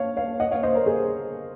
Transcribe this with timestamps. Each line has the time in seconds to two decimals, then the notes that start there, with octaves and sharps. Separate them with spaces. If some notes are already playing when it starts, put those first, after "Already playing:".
Already playing: C#5 F5
0.17 C#5 F5
0.40 D#5 F#5
0.51 C#5 F5
0.63 C5 D#5
0.75 A#4 C#5
0.86 G#4 C5